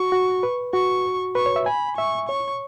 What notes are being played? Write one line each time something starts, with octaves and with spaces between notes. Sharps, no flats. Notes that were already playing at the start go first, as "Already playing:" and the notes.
Already playing: F#4 C#6
F#4
B4
F#4 C#6
B4 C#6
C#5
E5
G#5 B5
E5 C#6
C#5 C#6